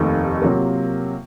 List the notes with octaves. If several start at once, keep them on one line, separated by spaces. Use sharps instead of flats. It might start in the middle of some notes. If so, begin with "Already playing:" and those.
Already playing: F1 D#2 D#3 A3 D#4
C3 F#3 A#3 F4 A#4